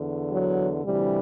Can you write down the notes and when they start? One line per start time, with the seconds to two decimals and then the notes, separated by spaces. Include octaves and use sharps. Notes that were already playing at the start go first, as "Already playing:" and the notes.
Already playing: E2 D3
0.31 F#3
0.84 D2 C3 E3 G3